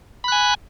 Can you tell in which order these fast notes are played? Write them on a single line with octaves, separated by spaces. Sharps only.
B5 F#6 G#5